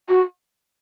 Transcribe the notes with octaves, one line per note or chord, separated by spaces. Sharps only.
F#4